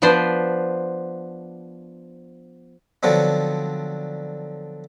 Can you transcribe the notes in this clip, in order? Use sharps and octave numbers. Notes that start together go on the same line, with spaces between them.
F3 B3 D4 B4 C5
D3 F3 F#3 B3 C4 D4